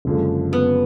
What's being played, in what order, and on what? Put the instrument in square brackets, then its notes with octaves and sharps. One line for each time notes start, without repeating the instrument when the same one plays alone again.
[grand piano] F#1 F#2 D3 F3 G#3
[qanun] B3